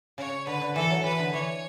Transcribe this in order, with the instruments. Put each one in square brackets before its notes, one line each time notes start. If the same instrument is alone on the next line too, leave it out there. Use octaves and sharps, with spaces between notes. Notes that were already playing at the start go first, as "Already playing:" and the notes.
[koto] C#3 [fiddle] C#5
[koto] D3 [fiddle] B4
[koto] D3
[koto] E3 [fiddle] A4
[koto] F#3
[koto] E3 [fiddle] B4
[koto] D3
[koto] E3 [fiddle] C#5